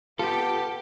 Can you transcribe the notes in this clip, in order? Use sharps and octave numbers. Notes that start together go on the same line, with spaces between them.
B3 F4 G4 A4